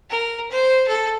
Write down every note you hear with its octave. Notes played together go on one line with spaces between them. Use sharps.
A#4
C5
A4